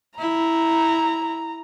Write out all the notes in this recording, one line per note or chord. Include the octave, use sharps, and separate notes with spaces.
E4 A#5